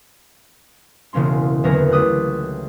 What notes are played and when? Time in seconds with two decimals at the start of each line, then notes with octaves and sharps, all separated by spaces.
1.13 E1 C#3 A#3 C#4 C6
1.63 F#1 E2 D3 A#4 C#5 A#6
1.92 C#2 A3 G4 D#6 F#6